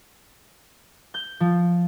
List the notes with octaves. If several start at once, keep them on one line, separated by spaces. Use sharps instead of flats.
G6
F3